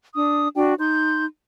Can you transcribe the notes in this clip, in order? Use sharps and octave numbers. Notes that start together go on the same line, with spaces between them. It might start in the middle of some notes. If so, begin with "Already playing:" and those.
D4 D#6
D4 F#4 G5
D#4 C6 G6